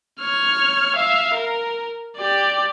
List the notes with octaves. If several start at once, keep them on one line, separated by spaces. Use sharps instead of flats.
C#5 F6
E5 F5
A#4
G4 D5